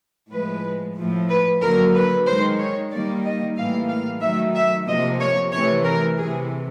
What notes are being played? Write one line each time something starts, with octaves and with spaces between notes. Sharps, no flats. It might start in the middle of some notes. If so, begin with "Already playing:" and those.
A2 F3 G#3 B4
A2 F3 A3
B4
D3 F#3 A#3 A#4
B4
D#3 G#3 C5
C#5
D#3 G3 A#3 D5
D#5
A2 E3 G3 A#3 F5
F5
D#3 F#3 A3 E5
E5
C3 F3 A#3 D#5
C#5
C3 E3 A3 C#5
A#4
C3 E3 A3 G#4